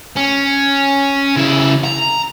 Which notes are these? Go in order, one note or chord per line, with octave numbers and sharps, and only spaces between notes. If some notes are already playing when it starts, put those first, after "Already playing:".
C#4
C#3 E4
A#5